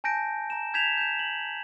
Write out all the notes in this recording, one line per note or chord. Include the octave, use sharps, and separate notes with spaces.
G#5 A5 G6 A#6 D7
A#5 E7
G6 G#6 B6 E7 F7
G6 E7
F#7